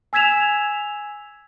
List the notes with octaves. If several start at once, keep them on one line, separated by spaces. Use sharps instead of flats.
G#5 E6 G#6 B6 E7 F7